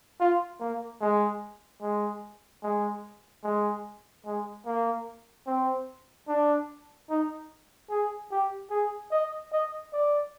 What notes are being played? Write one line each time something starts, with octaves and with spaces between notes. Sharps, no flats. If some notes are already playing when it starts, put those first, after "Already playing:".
F4
A#3
G#3
G#3
G#3
G#3
G#3
A#3
C4
D4
D#4
G#4
G4
G#4
D#5
D#5
D5